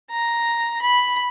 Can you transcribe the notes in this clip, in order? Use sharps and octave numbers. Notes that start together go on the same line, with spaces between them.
A#5
B5